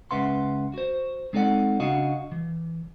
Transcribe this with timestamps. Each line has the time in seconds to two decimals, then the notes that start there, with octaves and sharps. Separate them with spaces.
0.11 C#2 C#3 B4 E5 F#5 C6
0.74 F#4 C5
1.33 G#3 C4 D#4 A4 D5 F#5
1.80 C#3 D4 F#4 D#5 F5 F#5
2.32 E3